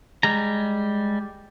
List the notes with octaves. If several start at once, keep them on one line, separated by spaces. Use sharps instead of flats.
G3 G#3 A#5